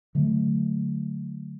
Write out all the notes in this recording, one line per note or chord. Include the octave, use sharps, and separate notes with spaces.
D3 F#3 A3